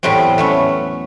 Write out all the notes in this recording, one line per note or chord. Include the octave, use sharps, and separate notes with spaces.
E2 A2 F#3 G3 A3 C4
A3 B3 C#4